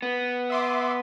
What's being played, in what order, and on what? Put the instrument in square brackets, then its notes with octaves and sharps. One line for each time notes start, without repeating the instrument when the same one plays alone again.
[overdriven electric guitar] B3
[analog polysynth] E5 C6 D6